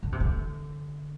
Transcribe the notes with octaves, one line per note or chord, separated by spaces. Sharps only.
D3
C3
D3